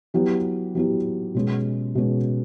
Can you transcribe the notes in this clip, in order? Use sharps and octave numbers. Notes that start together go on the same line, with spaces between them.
F#3 B3 E4 G4
F#3 B3 E4 G4
B2 G#3 C#4
B2 G#3 C#4